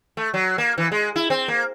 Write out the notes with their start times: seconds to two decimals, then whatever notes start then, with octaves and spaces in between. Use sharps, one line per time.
0.17 A3
0.34 F#3
0.58 A#3
0.78 E3
0.92 G#3
1.16 E4
1.30 C4
1.48 A#3